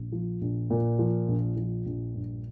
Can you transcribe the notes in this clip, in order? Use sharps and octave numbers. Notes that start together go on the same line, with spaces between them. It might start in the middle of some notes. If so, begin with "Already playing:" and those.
Already playing: A#1
F3
A#1
A#2
F3
A#1
F3
A#1
G2